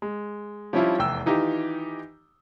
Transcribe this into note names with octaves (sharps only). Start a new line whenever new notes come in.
G#3
F3 G3 C#4 D4 E4 F4
F1 E2 G5 E6
D#3 E3 D#4 F4 G4